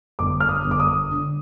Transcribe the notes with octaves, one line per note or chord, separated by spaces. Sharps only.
G1 D6
F6
D#6
G1
D6
D#6
D3